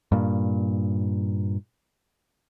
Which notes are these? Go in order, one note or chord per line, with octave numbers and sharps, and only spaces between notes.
G2 A#2